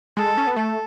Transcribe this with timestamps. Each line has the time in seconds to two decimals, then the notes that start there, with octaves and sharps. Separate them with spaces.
0.17 G#3 A4
0.37 C#4
0.47 B3
0.56 A3 A4